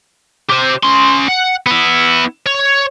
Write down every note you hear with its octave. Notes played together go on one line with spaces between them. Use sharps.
G4 C5
C#4 C6
F#5
B3 E4
C#5